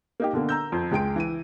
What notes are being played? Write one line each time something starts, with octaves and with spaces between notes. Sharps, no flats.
A#3 D#4 G4
B2 D3 A#3
A#5 E6 G6
F2
C#2 G#3 G5 D7
E3 E5 D#7